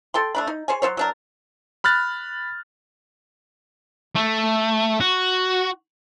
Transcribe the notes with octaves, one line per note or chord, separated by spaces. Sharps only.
A4 G5 C6
A3 D4 B5
D#4
G#4 C5 C#5 G#5
F#3 F4 C5 C#5
F#3 D4 A#4
B5 F6 F#6 A6
A3
F#4